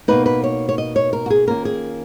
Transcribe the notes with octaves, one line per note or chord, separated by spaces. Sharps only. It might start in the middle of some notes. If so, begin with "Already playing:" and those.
B2 A#3 D#4 B4
B4
C#5
C#5
D#5
C#5
A#4
F#4
G#4
D#3 A#3 C#4 F4 A#4
G#4